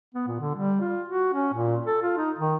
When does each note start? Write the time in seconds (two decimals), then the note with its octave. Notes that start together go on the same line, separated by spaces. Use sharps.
0.15 B3
0.28 A#2
0.40 D3
0.55 G3
0.81 F4
1.08 F#4
1.34 C#4
1.54 A#2
1.86 A4
2.02 F4
2.17 D#4
2.39 D#3